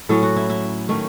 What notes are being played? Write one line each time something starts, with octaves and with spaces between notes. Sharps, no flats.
A2 F#3 C#4 A4
F#4
E4
E4
D#3 A3 C#4